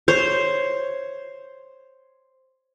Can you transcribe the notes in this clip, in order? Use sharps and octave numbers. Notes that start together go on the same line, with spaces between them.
C5 C#5